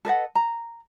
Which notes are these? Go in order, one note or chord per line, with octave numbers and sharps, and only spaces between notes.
A4 B4 D#5 F#5
A#5